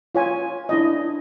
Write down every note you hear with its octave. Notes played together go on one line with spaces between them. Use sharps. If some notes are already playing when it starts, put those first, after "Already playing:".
F4 C#5 G#5
D4 E4 D#5